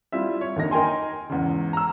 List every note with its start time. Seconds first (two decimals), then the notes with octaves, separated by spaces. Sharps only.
0.12 G3 C4 E4 F4 E5
0.41 C#5
0.56 D#2 D3 A#3 D#4 A#6
0.71 D#4 A#4 G5 G#5 C6
1.30 E2 G#2 C#3
1.73 A#5 E6